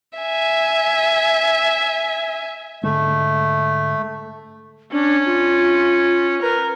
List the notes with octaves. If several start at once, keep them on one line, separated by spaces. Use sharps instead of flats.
E5 G#5
G#2 D3 G#3 A3
C#4 D4
F4
A#4 B4